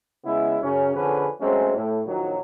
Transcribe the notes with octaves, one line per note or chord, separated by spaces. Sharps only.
C#3 G#3 B3 E4
F#2 C#3 C#4
F2 D3 C#4 G#4 B4
F#3 G#3 A3 C4 C#4
A2
A#1 A#2 D#3 F#3